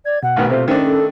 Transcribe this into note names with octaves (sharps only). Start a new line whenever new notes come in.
D5 G#6
B2 F#5
A1 D#3 B3
C3 A3 F4 C5
D#3 A3 C#4 D4 C5
A4